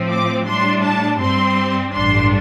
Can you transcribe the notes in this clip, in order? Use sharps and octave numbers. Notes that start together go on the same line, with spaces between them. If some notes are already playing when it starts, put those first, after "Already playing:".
Already playing: A2 F3 C4
D6
A2 G3 D4 C6
A5
G2 G3 C4 C6
A1 G2 G3 D4 C6